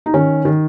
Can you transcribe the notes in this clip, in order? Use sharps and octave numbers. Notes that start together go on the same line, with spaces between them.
D#4
D#3 C#4
D#3